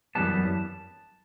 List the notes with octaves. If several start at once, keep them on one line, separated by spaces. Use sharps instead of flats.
F#2 E3 G3 B3 A5